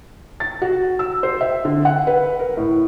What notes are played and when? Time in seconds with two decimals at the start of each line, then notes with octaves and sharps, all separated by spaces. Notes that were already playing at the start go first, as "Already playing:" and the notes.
0.40 A6
0.62 F#4
0.99 E6
1.23 C5
1.41 E5
1.65 D3
1.85 F#5
2.07 B4
2.39 A#4
2.57 A2